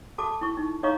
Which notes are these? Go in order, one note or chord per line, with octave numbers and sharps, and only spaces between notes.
F#4 A4 A5 D6
E4 C#6
D#4
D#4 C#5 D#5 F5 A#5 C#6